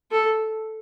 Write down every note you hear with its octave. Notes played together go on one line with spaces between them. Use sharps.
A4